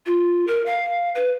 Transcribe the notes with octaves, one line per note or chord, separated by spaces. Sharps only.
F4
A#4
F5
B4